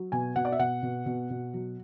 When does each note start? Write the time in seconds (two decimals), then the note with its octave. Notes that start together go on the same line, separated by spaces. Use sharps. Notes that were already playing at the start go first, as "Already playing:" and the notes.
Already playing: F#3
0.12 B2 G#5
0.36 B2 F#5
0.45 D5
0.52 E5
0.59 B2 F#5
0.83 B2
1.06 B2
1.30 B2
1.54 F#3